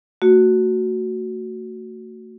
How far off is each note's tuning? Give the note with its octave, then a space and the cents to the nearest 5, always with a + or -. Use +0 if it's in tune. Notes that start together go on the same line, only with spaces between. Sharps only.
A3 +35 F#4 +0